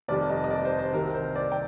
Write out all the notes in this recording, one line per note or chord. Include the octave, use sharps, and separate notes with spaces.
F1 F2 D#3 G3 D5
D#5
D#5
D5
C5
C5
C2 C3 D#3 A#4
C5
D5
G5